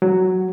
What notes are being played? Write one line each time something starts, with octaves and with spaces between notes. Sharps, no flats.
F#3